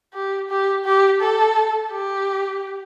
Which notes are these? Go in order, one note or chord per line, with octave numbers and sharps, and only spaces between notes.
G4
G4
G4
A4
G4